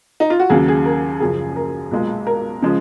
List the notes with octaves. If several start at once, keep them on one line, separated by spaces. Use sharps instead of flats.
D#4
F4
F#4
D#2 C#3 F#3 G#4
G#4
A#4
F#1 F#2 C#3 F3 G#4
A#4
B1 A#2 G#3
A#4
C#3 F3 G#3